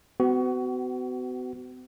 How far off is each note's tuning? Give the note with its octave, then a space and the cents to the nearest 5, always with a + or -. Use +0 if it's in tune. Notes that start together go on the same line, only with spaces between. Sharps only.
B3 +45 F#4 +25